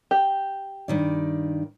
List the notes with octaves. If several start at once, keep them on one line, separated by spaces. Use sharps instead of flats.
G4
G2 D#3 D5